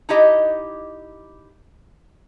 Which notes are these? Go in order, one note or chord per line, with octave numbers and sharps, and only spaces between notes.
D#4 E4 G4 D#5